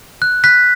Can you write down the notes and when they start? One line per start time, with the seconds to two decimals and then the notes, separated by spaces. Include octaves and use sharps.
0.22 F#6
0.44 F#6 B6